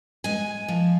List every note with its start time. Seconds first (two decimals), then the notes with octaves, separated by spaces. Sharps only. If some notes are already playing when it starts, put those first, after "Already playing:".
0.24 G#3 G#5
0.68 F3